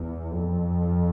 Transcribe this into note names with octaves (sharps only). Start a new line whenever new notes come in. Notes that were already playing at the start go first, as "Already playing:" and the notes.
Already playing: E2
F2